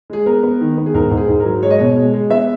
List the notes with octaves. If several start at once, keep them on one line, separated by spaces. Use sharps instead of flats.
G#3 G#4
B3 A#4
B3
D#3
B3
G#4
G#2 A#4
G#2
G#4
G#2
A#4
F#3
G#3 C#5
D#5
B2 C#5
G#3
G#3
B3 E5